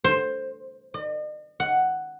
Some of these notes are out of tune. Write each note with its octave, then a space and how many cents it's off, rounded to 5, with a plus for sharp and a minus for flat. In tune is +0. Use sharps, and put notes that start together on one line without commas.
C5 +10
D#5 -45
F#5 +5